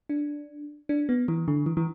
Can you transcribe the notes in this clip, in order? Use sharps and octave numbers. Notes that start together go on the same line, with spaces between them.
D4
D4
B3
E3
D3
E3
E3